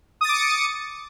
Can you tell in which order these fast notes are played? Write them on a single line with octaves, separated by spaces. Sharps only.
D#6 A6 D6 C#7